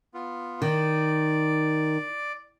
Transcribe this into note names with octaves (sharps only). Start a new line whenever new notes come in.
B3 F4
D#3 D5